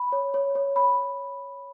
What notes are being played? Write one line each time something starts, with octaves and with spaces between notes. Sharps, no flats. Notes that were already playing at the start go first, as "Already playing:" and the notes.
Already playing: B5
C#5
C#5
C#5
B5